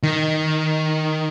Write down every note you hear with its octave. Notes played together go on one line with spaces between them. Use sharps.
D#3